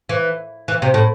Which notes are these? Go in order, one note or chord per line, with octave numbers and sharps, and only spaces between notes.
E3
E3
C3
A2